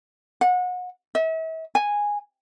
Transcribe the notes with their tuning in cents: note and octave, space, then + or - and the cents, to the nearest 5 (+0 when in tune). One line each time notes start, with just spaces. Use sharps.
F#5 -30
E5 -40
G#5 -10